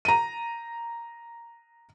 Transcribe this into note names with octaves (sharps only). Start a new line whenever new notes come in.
A#5 D#7